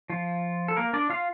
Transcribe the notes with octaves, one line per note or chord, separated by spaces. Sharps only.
F3 F4
A4
A#3 A#4
D4 D5
F4 F5